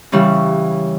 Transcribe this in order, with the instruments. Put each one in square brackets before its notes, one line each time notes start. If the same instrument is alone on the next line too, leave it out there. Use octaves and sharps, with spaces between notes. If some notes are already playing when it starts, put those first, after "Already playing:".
[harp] C#3 E3 G3